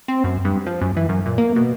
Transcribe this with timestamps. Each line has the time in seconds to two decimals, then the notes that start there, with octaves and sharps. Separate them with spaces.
0.08 C4
0.24 F#2
0.45 G2
0.66 F3
0.81 F#2
0.97 E3
1.09 F#2
1.26 A#2
1.38 A#3
1.56 B2